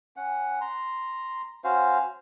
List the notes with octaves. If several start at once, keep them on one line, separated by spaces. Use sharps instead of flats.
C#4 F#5
A#5 C6
C#4 F#4 C5 F5